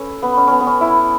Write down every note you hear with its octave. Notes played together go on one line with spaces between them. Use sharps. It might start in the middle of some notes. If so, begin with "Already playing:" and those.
Already playing: C#4 A4 B4
B3
C#4
B3 C#4
B3
C#4
E4